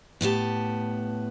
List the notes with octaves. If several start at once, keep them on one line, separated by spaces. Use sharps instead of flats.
A2 B3 G4 A5